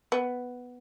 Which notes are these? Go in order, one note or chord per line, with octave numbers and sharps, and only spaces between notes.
B3